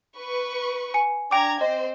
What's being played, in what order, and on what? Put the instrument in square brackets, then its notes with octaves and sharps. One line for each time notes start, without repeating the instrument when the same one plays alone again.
[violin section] B4 C#6
[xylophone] G#5 C#7
[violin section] D4 A#5 G#6 [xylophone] G5 D6
[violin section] C4 C5 [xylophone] D#5